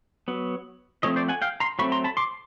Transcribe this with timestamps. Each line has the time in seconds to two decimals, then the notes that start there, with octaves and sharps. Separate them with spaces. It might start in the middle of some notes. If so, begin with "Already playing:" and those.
0.28 F#3 B3
1.03 F3 A3 C4 C#5 D#5
1.16 C5 D5
1.28 F#5 G#5
1.42 F5 G5
1.60 A#5 C6
1.79 F#3 A3 C4 B5 C#6
1.92 A#5 C6
2.04 A5 B5
2.17 C6 D6